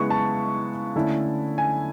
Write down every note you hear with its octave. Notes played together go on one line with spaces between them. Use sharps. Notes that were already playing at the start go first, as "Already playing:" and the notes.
Already playing: C#3 G#3 B3 E4 C#6
A5
D3 A3 C#4 E4
G#5